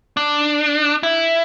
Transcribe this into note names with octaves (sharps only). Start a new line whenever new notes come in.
D4
E4